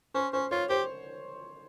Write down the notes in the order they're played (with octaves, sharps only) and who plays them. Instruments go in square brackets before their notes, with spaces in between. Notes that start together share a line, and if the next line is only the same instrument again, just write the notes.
[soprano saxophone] C#4 [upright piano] C5
[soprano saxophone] C#4 [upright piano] C5
[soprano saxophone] F4 [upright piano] C#5
[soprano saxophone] G4 [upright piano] C5